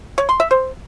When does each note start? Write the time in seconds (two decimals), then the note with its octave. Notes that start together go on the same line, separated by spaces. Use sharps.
0.18 C#5
0.29 C6
0.40 E5
0.51 C5